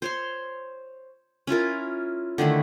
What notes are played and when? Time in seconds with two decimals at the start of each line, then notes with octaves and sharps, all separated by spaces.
0.02 C5 C#5 C6
1.47 C#4 E4 F4 A#4
2.38 D3 D#3 A3 E4